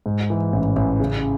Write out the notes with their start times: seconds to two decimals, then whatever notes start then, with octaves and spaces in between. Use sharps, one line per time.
0.06 G#2
0.30 E3
0.53 A1
0.76 A1
1.00 C#3